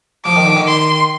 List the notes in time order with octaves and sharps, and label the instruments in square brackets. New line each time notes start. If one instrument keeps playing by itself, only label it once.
[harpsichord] F3 [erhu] D6
[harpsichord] D#3
D3
D#3
[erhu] C6